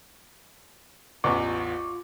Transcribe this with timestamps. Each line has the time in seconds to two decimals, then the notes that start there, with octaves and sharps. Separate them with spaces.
1.24 A1 E2 F4 C#6 D6